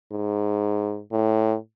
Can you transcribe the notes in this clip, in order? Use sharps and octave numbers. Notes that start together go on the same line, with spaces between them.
G#2
A2